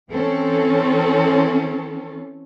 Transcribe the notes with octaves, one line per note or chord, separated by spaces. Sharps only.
E3 C4 C#4 A4